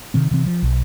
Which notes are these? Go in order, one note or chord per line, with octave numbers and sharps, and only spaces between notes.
C3 D#3 C4
C3 E3 C4
F3
B1